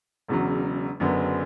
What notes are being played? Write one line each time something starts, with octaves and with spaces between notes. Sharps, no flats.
E1 E2 C#3 F#3
F#1 F#2 D3 F#3 B3